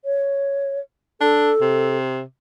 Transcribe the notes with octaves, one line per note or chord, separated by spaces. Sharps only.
C#5
D4 A4
C3